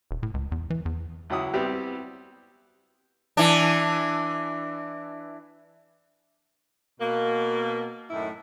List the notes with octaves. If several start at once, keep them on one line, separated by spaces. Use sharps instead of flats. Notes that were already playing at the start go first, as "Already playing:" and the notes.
D#1
A2
C#2
E2
E3
E2
C#2 F#3 E4 F#5 D#6
G3 B3 C4 E4 G4
E3 D4
B2 A#3
F#2 A2 D#3 E4